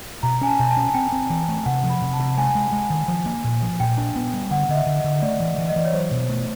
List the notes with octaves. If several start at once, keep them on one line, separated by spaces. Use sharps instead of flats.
B2 A#5
C#4 G#5
A5
B2
A5
C#4
C4 G5
C4
E3
A3
C3 F#5
F3
B5
C3
A5
C3
G#3 G#5
G#3
G#3
D#3
F3
A#3
A#2
F3
A#2 G5
D4
B3
G3
D3 F#5
D3 D#5
E5
D3
D#5
D3
A3 D5
E3
E3
D#5
E3 D5
C#5
F#3 C5
B2
A3